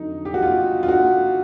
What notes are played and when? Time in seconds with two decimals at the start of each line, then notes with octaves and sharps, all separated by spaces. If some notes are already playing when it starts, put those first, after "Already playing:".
Already playing: F2 D3 F#3 D#4
0.25 G4
0.34 F#4
0.42 F4
0.83 F4
0.88 F#4